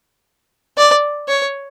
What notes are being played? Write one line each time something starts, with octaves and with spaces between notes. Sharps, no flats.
D5
C#5